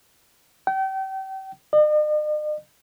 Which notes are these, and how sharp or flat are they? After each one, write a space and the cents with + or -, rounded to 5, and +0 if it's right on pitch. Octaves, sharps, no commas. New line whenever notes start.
G5 -35
D#5 -45